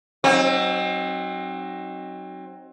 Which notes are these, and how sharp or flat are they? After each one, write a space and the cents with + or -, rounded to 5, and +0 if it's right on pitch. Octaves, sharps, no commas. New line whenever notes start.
F#3 +15 C4 +30 D#4 +0